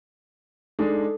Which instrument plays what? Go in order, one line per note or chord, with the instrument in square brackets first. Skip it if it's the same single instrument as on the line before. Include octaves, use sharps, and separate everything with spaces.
[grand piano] G#3 D4 D#4 [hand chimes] A4